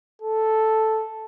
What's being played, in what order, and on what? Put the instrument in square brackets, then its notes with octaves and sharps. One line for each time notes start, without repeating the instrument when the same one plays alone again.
[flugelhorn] A4